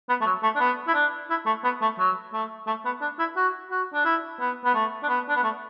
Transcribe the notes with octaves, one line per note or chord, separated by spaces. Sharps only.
B3
A3
F#3
A3
D4
B3
E4
D4
E4
A3
B3
A3
F#3
A3
A3
B3
D4
E4
F#4
F#4
D4
E4
B3
B3
A3
D4
B3
D4
B3
A3